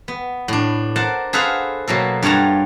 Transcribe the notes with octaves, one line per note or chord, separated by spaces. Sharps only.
B3
A2 D4
A#4 C5 F#5 A5
G#4 A4 B4 C5 F5 F#5
B2 F#3 A#3 A4
G2 F4 C#5 F#5 A5 A#5